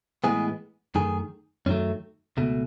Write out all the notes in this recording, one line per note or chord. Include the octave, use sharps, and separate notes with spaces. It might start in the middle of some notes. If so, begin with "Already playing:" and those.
A2 E3 G#3 B3 G#4
F#2 D#3 A3 G#4
F#2 D#3 F#3 A3 C#4
C#2 B2 A3